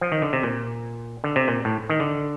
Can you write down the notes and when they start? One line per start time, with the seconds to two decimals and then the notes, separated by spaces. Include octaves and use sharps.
0.01 F3
0.12 D#3
0.22 D3
0.33 C3
0.43 A#2
1.24 D3
1.36 C3
1.48 A#2
1.65 A2
1.90 D#3
2.00 D3